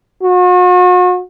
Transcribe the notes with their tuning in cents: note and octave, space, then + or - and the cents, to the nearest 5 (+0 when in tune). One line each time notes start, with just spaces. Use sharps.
F#4 -40